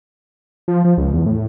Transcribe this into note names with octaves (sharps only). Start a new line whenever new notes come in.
F3
F3
C#2
E2
A2